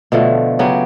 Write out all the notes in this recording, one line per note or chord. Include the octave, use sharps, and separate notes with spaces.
B2 D3 F3 A3
C#3 F#3 B3 G4